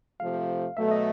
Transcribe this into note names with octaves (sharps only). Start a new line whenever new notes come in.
C3 F3 A3 F5
B2 F#3 A3 E5
D#5